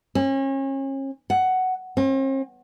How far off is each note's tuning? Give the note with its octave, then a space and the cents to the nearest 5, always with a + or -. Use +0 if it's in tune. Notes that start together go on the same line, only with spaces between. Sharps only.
C#4 -35
F#5 +10
C4 +45